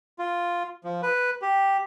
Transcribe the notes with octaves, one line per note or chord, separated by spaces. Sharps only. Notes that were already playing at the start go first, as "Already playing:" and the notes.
F4
F3
B4
G4